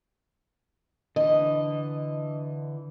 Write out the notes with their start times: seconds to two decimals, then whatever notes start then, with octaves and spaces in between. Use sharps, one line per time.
1.16 D3 E3 D#5